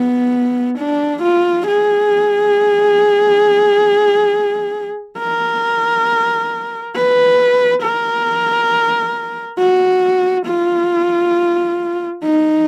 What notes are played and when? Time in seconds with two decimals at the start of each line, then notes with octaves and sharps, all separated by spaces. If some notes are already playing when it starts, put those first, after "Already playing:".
Already playing: B3
0.79 D4
1.23 F4
1.67 G#4
5.19 A#4
6.96 B4
7.83 A#4
9.58 F#4
10.47 F4
12.24 D#4